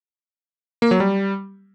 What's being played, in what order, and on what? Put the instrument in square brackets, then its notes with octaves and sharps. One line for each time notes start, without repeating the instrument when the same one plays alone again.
[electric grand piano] A#3
F#3
G3